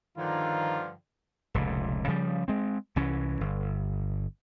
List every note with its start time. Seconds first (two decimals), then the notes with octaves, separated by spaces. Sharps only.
0.18 G2 D3 D#3 F3 F4 A#5
1.54 F1 C#2 A#2
2.07 C#3 F3 G3
2.48 G#3 C4
2.96 C2 E3 C#4
3.41 G1